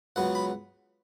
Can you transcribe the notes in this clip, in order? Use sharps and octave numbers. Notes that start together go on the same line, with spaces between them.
C#2 C#3 F#3 B3 F#5
B5